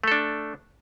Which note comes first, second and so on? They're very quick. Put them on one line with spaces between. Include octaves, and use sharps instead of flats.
A3 A4 D4